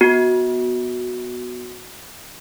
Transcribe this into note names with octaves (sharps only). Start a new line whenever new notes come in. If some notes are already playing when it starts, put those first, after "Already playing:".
B3 F#4